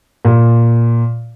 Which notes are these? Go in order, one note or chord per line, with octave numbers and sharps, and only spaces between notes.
A#2